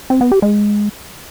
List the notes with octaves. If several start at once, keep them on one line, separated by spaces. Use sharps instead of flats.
C4
B3
G4
G#3